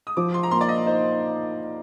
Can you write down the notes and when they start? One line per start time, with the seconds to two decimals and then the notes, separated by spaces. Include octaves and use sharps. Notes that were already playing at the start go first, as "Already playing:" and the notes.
0.07 D#6
0.17 F3 D6
0.34 C6
0.43 A#5
0.51 A#3 C6
0.61 D5
0.68 D#5
0.86 D#4 C5